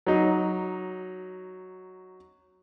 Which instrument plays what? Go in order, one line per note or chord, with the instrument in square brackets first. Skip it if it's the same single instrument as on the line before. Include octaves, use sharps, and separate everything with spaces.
[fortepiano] F#3 D#4